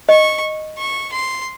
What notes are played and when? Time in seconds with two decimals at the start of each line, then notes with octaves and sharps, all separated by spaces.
0.09 D#5 C#6
0.78 C#6
1.12 C6